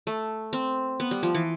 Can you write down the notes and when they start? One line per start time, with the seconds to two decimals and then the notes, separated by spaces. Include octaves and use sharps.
0.07 A3
0.53 C4
1.00 B3
1.11 G3
1.23 F3
1.35 E3